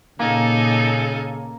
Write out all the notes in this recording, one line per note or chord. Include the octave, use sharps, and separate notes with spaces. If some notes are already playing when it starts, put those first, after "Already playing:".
A#2 C#3 A#3 D#4 A4 G#5